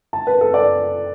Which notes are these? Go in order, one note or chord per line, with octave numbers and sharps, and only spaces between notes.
A5
B4
A4
D5